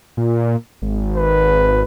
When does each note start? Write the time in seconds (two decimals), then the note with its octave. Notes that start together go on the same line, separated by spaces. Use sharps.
0.17 A#2
0.82 G#1
1.16 B4